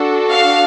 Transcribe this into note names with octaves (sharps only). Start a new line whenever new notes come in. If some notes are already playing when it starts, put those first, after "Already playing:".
Already playing: D4 F#4 A4
F5